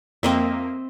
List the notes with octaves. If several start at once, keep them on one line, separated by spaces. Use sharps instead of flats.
F2 A#3 C4 D#5 E5